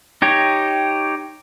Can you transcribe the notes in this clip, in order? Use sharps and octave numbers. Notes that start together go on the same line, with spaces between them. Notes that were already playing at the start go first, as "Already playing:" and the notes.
D#4 G4 C#5